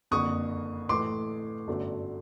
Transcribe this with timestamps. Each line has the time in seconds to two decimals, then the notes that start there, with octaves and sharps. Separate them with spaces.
0.11 F#1 F2 D3 C#6 D#6
0.89 A2 E3 A3 C6 D6
1.67 G1 F#2 D3 F#3 A3